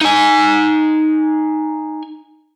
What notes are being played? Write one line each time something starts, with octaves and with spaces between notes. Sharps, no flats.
D#4 G#5